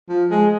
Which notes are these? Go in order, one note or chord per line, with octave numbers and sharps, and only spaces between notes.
F3
G#3